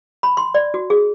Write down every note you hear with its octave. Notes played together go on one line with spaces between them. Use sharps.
B5
C6
D5
F#4
G#4